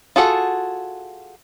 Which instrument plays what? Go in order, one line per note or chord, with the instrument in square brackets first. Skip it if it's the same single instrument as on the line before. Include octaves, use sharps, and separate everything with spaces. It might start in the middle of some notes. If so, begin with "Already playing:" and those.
[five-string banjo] F4 F#4 G#4 A4 F#5